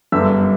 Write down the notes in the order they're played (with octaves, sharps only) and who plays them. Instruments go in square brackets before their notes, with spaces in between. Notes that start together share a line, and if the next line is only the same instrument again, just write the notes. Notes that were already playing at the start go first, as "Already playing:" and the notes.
[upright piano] G1 F#2 D3 G3 B3 E5 E6